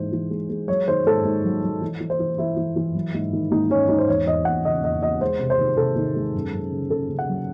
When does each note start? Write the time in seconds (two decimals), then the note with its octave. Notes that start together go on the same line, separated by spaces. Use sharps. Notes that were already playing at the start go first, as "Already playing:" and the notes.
Already playing: G#2 E3 G#3 C5
0.13 E3
0.30 G#3
0.49 G#3
0.68 F#3 C#5
0.87 D#3 C5
1.06 G#2 A4
1.25 G#2
1.44 F#3
1.63 F#3
1.81 E3
2.00 E3
2.10 C5
2.20 E3
2.38 E3 E4
2.57 E3
2.76 E3
2.94 F#3
3.14 G#2
3.33 D#3
3.51 G#2 D#4
3.70 G#2 C#4
3.89 G#2 D#4
3.98 C5
4.08 E2 C#5
4.26 E2 D#5
4.45 E2 F#5
4.65 C#3 D#5
4.83 E2 D#5
5.02 E2 D#5
5.21 G#3 C5
5.39 C3
5.50 C5
5.59 D#3
5.77 C3 A4
5.96 D#3
6.16 G#3
6.34 F#2
6.53 F#2
6.72 C#3
6.90 C#3 A4
7.09 C#3
7.19 F#5
7.29 F#3